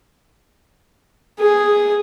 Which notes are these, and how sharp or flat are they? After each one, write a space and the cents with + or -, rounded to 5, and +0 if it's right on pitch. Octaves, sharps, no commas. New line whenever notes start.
G#4 -5